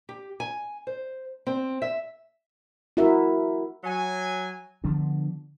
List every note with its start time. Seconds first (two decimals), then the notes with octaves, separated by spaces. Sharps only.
0.09 G4
0.40 G#5
0.87 C5
1.47 C4
1.82 E5
2.97 E4 F#4 A#4 E5
3.84 F#3 G#5
4.84 D3 F3 B3 D4